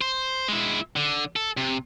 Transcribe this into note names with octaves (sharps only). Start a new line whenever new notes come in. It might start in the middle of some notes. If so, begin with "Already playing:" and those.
C5
G#3 E4
D3
A4
C3